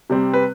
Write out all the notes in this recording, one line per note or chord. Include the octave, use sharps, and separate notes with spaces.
C3 G3 C4
B4